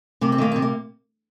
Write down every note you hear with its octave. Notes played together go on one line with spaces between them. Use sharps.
C3 A#3
C4
D#3 A#3
C3 C4
A#3